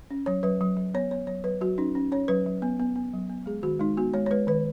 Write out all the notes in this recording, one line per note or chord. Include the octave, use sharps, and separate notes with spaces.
C#4
F#3 C#5
F#3 B4
F#3
F#3
B3 C#5
B3 C#5
F#3 C#5
F#3 B4
F#3 F#4
C#4 D#4
C#4
C#4 C#5
F#3 B4
F#3
B3
B3
B3
F#3
B3
G#3 G#4
D#3 F#4
G#3 D#4
B3 F#4
G#3 C#5
C#5
G#3 B4
D#3 B4